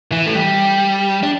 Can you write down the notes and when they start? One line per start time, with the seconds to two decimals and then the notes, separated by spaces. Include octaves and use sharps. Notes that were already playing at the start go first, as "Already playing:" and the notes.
0.12 E3
0.26 A3
0.35 G3
1.23 D4